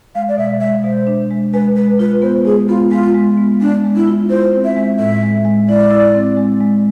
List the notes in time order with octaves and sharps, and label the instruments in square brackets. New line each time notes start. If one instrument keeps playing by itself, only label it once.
[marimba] G#3 [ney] F5
[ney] D5
[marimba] B2 [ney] E5
[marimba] G#3 [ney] E5
[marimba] B2 [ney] C5
[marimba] D4
G#3
[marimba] G#3 [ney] B4
[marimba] G#3 [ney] B4
[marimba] F4 [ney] B4
[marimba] B3 [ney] C5
[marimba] G#3 [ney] G#4
[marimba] B3 [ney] F4
[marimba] G#3 [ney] F4
[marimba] G#3
B3
[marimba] G#3 [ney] D4
[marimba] G#3
[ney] E4
[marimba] F4
[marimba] E4 [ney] C5
[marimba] C4
[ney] E5
[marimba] G#3
[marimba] A2 [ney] E5
[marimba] G#3
G#3
[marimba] E4 [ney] D5
[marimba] E4
C4
G#3
G#3